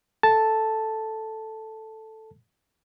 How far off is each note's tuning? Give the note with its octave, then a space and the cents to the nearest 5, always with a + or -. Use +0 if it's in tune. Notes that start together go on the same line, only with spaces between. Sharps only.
A4 +0 A5 +0